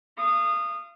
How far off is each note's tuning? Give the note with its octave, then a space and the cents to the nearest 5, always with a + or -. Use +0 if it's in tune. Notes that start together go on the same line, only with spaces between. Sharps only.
F5 -30 D#6 -20